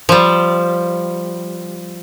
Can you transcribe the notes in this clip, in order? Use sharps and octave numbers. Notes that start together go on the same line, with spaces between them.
F3 G3